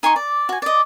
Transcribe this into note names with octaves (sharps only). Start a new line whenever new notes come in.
D#4 G#5 C6 C#6
D5
F#4 G#5
D5 D#5